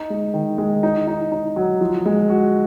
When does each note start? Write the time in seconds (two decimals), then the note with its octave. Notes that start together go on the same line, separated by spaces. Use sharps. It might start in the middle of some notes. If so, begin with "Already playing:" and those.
Already playing: D#4
0.10 G#3
0.34 D#3
0.58 G#3
0.83 D#4
1.07 D#4
1.32 D#4
1.56 F#3
1.81 F3
2.06 G#3
2.29 F#4